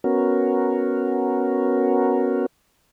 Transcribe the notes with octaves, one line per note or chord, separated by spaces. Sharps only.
B3 C#4 F#4 A#4